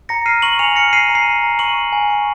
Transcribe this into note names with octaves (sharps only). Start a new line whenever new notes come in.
A#5 A#6 C#7
F6 C7 D#7
C#6 D#7 F#7
G#5 C#7 F7
F6 A#6 C#7
F6 C7 D#7
A#5
C7 D#7
A#5
A#5
C#6 D#7 F#7
C#6
G#5
C#6